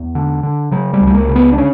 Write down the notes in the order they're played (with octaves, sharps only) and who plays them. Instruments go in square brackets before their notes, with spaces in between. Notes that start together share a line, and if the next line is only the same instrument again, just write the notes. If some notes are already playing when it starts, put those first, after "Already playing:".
Already playing: [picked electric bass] E2
D3
D3
C#3 F#3
G3
C#2
G3
A#3
C#3
B3
D4
D3 C#4